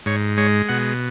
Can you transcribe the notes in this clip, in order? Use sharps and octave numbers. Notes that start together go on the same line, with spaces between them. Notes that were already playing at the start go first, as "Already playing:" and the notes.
G#2 C#5
G#3 C#5
B2 F#5